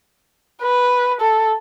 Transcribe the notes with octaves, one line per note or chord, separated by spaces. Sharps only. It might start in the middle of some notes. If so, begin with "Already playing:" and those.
B4
A4